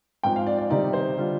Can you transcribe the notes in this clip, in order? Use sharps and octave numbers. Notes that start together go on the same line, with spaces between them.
G#2 F3 C4 G5
F5
D5
D5
C3 D#3 G3 C4 D#4 D5
C5
D3 G3 D4 F4